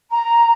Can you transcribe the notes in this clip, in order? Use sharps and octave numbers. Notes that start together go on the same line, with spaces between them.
A#5